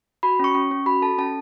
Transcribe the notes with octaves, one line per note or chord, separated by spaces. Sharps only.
F#4 B5
C#4 C#6
C#4
C#4
F#4 B5
A4 A5
C#4 A5